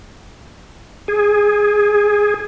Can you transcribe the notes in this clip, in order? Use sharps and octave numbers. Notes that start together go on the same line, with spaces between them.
G#4